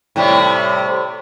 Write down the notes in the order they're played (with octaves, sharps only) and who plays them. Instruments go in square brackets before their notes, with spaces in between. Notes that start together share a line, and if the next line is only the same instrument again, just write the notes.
[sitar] A2 C3 G3